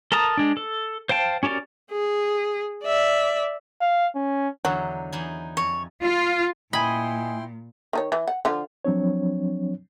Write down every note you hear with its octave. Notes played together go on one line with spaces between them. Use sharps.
A4 A#4 A5 A#5 D#6
G#3 D4
A4
C5 F5 G5 A5
C#4 F#4 G4 A#4 D5
G#4
D5 E5
F5
C#4
E2 D3 F#3 D#4
E2 D#4 G#4
F2 C#5
F4
A#2 E4 D#5 G5 G#5 B5 C6
D#3 D#4 C#5
E3
F#5
D3 F3 F4
F3 F#3 C4 D4 C#5